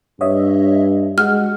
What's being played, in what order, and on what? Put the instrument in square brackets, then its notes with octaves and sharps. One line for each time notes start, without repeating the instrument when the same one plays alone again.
[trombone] G2 [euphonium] D4 [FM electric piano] C#5 D#5 E5
[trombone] G#3 [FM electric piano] F#4 F#5 [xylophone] F6